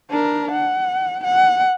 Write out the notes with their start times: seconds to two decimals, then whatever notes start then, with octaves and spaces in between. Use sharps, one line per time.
0.10 D4 A#4
0.52 F#5
1.25 F#5